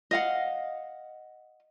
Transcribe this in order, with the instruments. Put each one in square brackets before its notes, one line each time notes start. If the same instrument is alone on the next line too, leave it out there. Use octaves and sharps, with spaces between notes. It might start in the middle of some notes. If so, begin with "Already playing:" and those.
[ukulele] D#5 F5 F#5